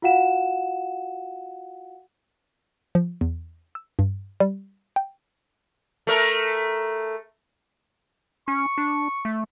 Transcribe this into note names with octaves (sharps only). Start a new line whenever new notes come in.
F4 F#4 F5 F#5 E7
F3
E2
E6
G2
G3
G5
A3 A#4
C#4 C#6
D4
A3